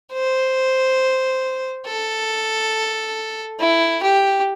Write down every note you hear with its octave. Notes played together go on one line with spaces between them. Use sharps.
C5
A4
E4
G4